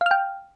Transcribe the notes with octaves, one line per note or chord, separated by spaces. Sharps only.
F5 G5 F6